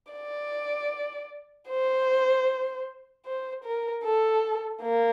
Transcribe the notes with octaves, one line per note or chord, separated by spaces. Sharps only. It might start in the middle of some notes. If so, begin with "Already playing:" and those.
D5
C5
C5
A#4
A4
A#3